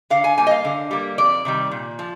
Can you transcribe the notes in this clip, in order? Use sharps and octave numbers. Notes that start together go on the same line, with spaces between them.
D3 F5
G#5
G3 A#3 G#5
D#5
F5
D3
G3 A#3
F2 D5
C3 D#3 G3
A#2
F3